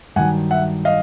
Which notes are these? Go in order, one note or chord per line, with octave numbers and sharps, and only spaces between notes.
G2 D#3 F#3 F#5 G#5
E5 F#5
D#5 F5